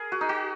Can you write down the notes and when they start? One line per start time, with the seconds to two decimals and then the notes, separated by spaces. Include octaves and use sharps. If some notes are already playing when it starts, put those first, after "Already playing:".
Already playing: G#4 A#4
0.12 F#4
0.21 D#4
0.29 F#4